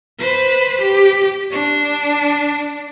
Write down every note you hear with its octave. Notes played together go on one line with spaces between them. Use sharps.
B4 C5
G4
D4